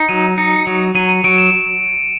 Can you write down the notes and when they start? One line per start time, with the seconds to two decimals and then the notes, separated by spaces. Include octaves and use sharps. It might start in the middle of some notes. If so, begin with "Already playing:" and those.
Already playing: D#4
0.09 F#3 D#7
0.38 D#4 C#7
0.56 C#7
0.67 F#3
0.95 F#3 D#7
1.09 D#7
1.24 F#3 D7
1.38 E7